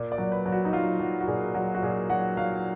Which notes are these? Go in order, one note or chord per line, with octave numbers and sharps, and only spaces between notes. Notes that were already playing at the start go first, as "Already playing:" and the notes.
Already playing: A#2
D5
F#3
B4
F#3
F#4
D#4
F#3 F4
F#3
F#4
A#2 G#4
F#3 F#4
F#4
A#2 G#4
F#3 F#5
F#3 F5